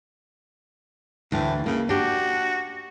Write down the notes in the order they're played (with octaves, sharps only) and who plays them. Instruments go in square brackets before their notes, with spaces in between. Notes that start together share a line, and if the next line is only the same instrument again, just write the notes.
[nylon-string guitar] D2 E3 [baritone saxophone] A2
[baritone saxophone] C#3 [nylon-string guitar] A#3
[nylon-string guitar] D4 G4 [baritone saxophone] F#4